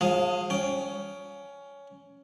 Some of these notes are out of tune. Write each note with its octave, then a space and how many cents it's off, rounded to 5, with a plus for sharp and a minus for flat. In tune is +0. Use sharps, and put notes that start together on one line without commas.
F3 +45 G#4 +0 F5 +0
C#4 +15 G5 +0